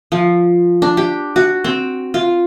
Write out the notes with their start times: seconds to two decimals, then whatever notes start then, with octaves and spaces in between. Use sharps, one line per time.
0.12 F3
0.82 D4
0.97 G4
1.36 F#4
1.64 C4
2.14 F4